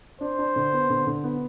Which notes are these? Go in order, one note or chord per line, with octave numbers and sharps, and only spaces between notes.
D4 C5
D4
D3
B3
D3
D3
B3